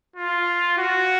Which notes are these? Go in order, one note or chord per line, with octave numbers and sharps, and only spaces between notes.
F4
F#4